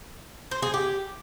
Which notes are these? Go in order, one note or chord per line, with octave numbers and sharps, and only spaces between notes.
C5
G#4
G4